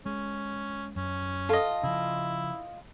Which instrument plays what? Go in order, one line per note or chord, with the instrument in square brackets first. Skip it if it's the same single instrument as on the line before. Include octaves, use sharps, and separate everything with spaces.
[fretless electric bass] G#3 [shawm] C#4
[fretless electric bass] F#2 [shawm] C#4
[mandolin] F4 D#5 [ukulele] A4
[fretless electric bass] C#3 F3 [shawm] E4